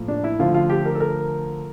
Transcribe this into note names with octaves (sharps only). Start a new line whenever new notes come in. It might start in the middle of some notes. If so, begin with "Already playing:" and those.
Already playing: A2 F3 A#3
D4
E4
D3 F3 A3 F4
F4
G4
A#4
A4
A#4